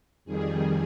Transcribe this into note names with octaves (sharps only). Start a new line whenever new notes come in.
F2 D#3 G3 G#4